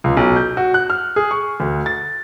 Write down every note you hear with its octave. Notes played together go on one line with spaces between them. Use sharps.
C#2
B1
G6
F#4
F#6
F6
G#4
C#6
D2
A6